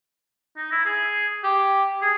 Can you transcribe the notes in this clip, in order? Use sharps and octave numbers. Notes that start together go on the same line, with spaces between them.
D#4
E4
G#4
G4
G#4